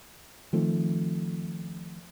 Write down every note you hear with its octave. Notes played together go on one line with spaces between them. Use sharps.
D#3 F3 A3 C4